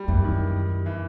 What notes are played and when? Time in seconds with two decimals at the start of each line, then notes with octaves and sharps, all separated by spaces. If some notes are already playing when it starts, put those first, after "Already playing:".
Already playing: G3
0.08 F#2 E3
0.24 D#3
0.86 E3